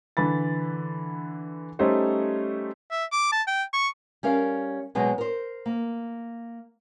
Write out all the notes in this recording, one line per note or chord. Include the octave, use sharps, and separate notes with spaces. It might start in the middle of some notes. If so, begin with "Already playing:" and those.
D3 E3 B5 A6
G3 A3 C#4 D#4 C5 C#5
E5
D6
A5
G5
C#6
G3 C#4 A#4 F5
B2 F#3 G#3 B3 C4
A#4 C5
A#3